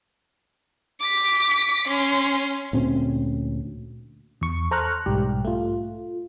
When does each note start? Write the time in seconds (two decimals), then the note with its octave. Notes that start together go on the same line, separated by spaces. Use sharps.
1.00 D6 B6
1.88 C#4 C6
2.73 D2 A#2 C4 C#4
4.41 E2 C#6
4.71 A4 C5 A#5 C#6 F6 F#6
5.06 B1 G#2 G3 G4
5.45 A3 F4